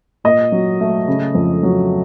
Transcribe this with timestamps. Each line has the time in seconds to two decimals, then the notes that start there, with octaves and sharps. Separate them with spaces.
0.24 A#2 D#5
0.52 F#3
0.80 A3
1.08 C#3
1.35 F2
1.63 F#3